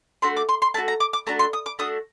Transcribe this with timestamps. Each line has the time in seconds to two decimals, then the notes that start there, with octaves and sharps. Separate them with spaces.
0.22 A3 D4 F#4 C6
0.37 D6
0.49 C6
0.62 C6
0.74 A3 D4 F#4 A5
0.88 A#5
1.00 D6
1.13 D6
1.27 A3 D4 F#4 A#5
1.39 C6
1.53 D#6
1.66 D6
1.79 A3 D4 F#4 D#6